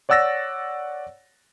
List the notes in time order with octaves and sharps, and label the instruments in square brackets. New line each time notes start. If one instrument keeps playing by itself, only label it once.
[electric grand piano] C#5 D5 F#5 E6 A6 A#6